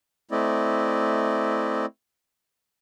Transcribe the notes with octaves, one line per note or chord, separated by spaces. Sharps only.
A3 C4 E4 D5 D#5